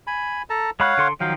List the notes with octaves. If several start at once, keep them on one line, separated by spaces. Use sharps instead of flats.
G#5 B5
A4 A5 A#5
G#3 C#5 F5 F#5 B5 F#6
D3 A4 C6
D#3 F3 F#3 F5 G5